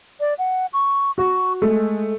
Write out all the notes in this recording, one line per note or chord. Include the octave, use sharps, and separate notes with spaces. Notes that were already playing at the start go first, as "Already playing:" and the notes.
D5
F#5
C#6
F#4 C#6
G#3 A3